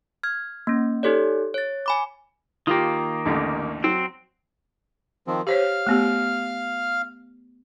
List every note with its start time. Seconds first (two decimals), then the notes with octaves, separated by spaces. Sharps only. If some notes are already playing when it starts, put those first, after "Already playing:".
0.23 F6 G#6
0.67 A#3 C#4
1.03 D#4 G4 A4 C#5 D5
1.54 C#5 A6
1.86 G#5 B5 D6
2.67 D#3 A#3 F4 G4
3.25 A1 D#2 D3
3.84 F#3 C4
5.27 D#3 F3 C4
5.47 G4 C5 C#5 F5 F6
5.87 A3 B3 G4